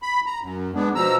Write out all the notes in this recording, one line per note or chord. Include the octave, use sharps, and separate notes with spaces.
B5
A#5
F#2
G#3 B3 D4
B2 F3 A#5 E6